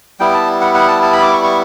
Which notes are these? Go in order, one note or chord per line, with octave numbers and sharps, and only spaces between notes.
G3 B3 E4 G5
A5
F#5
F#5
A5
A5
B5
D6
C#6
C#6